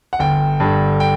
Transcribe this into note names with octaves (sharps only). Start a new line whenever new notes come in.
F#5
G1 G5
G2 D3
G5